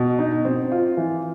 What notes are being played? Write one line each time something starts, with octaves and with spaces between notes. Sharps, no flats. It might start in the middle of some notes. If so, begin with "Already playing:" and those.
Already playing: B2
D#4
C4
F4
E3